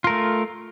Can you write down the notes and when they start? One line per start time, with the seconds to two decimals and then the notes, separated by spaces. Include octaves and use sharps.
0.04 F4
0.07 A#4
0.10 A3